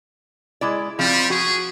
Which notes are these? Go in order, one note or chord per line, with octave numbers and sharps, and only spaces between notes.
G#3 E4 D5
F3 G3 C4
F#4 G#4